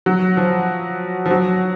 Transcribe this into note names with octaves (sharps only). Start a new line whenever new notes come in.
F#3
F3
F3
F#3